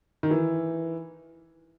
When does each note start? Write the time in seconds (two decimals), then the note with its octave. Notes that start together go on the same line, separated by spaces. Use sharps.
0.23 D#3
0.31 E3